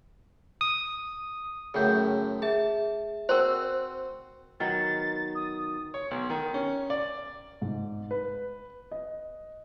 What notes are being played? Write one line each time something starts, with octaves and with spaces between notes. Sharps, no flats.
D#6
F#2 A2 C#3 G#4 G5 G6
G#4 E5 A5
C4 F#4 A#4 C5 C6
D#3 F#3 B3 A6
D#6
C#5
B1
D#3
C#4
D5
G#2
B4
D#5